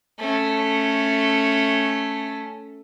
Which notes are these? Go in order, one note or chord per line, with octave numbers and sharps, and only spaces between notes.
A3 C#4